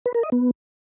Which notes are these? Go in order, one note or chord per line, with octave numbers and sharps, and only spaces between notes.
B4
A#4
D#5
B3